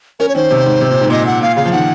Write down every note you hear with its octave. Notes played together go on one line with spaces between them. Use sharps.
C#4 A#4
C#5
D#3 C5
C3
G#2
C3
A#2
G#2
A#2 D#5
F#5
A#2 F5
C#3 F5
F3
D#3 F#5